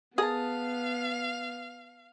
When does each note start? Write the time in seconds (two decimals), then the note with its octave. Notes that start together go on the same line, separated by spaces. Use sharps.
0.18 B3 G#4 A#4 F5 A5 D#6